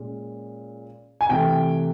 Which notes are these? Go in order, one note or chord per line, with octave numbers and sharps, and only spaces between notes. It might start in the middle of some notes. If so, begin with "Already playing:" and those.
Already playing: A#2 G#3 C#4
G#5
C3 E3 A3 G5